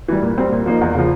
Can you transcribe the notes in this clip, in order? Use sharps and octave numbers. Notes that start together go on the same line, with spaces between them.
E3 G3
A#2
G3 C4
A#2
F3 A#3 D#4
E2
C#3 F3